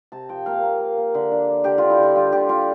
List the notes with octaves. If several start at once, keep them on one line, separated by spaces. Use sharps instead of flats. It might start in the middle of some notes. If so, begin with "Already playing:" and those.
C3 A5
F3 G5
A#3 F5
A#3
A#3
A#3
D3
D4
D4
D3 G4
D3 F4
E4
D3 F4
G3 F4
D3 G4
D4 F4